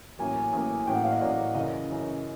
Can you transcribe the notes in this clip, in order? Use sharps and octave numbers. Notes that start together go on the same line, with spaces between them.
A1 A2 F#3 A#3 G#5
A1 A2 F#3 A#3
A1 A2 F#3 A#3 G5
F#5
F5
D#5
A1 A2 F#3 A#3 D5
F#2 C#3 E3 D#5
F#2 C#3 E3